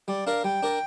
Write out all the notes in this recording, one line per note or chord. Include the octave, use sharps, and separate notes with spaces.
G3 D5
D4 A#4 D5 F5
G3 G5
D4 A#4 D5